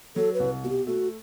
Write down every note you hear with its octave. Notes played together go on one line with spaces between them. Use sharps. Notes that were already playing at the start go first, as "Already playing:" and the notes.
F#3 A4
B4
C2
B2 F#4
G4
A3 F#4